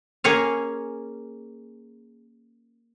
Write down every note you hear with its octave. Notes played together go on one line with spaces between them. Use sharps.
A#3 C#4 G#4 C#5 F5